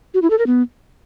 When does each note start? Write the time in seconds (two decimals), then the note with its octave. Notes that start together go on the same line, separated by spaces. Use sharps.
0.14 F#4
0.22 E4
0.30 A4
0.38 A#4
0.47 B3